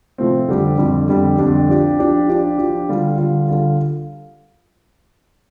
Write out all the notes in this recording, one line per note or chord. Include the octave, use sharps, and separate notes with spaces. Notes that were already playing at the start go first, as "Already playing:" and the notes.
C3 F3 A3 C4
F2 D3 G3 D4 G4
F2 D3 G3 D4 G4
F2 D3 G3 D4 G4
F2 D3 G3 D4 G4
F3 D4 G4
F3 D4 G4
F3 D4 G4
F3 D4 G4
D3 G3 F4
D3 G3 F4
D3 G3 F4